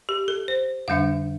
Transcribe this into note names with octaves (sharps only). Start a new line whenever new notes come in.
G4
A4
C5
F2 D3 G3 D4 F5